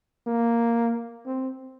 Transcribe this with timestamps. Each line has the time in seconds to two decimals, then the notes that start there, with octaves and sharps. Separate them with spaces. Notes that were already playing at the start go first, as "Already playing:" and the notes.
0.27 A#3
1.26 C4